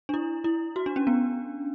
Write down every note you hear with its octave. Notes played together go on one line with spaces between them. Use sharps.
D4
E4
E4
F#4
D4
C#4
B3